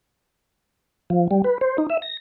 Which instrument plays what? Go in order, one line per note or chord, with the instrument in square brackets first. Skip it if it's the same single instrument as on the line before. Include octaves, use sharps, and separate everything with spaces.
[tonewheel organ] F3
G3
B4
C5
D#4
E5
A#6